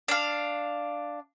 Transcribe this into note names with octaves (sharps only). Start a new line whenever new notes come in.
D4 F5